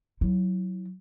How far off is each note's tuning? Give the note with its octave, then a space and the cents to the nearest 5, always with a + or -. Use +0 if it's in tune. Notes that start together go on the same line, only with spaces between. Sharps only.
F#3 +0 E4 -10